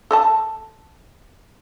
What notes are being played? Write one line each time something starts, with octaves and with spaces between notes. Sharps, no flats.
A4 D#5 A5